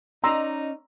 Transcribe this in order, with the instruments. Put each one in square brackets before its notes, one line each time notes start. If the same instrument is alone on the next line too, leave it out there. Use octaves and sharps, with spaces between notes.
[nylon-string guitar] C#4 D5 D#5 [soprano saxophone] D#4 [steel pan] A#5 C6 E6